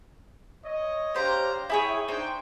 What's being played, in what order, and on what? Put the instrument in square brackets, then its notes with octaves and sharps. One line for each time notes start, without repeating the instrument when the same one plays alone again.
[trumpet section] C#5 D#5
[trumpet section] D4 C#5 A#5 [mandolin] G4 C5 F5
[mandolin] E4 G#4 C#5 [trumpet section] G5
[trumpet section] D4 G5 [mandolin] D#4 C5